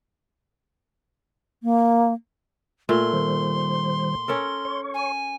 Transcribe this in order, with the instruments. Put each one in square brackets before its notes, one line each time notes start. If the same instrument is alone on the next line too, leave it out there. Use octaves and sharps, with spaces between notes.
[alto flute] A#3
[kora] A#2 A3 [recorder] C6
[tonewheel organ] D#3 G3 C5
[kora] C#4 A4 A#4
[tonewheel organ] C#5 C#6
[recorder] G#5